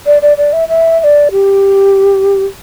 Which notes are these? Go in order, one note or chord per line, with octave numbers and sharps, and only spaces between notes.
D5
D5
D5
E5
E5
E5
D5
G4